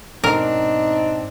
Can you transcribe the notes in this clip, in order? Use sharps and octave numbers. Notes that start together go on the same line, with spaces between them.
G#2 B2 C4 D4 D#4 A#4